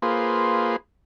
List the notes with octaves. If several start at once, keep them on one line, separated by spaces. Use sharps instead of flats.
A#3 F4 G#4 B4 C5